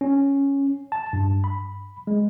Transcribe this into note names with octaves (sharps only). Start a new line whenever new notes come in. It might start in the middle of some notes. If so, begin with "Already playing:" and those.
C#4
A5
G2
B5
G#3